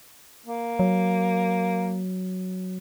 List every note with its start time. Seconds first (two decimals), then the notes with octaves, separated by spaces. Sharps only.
0.46 A#3
0.79 F#3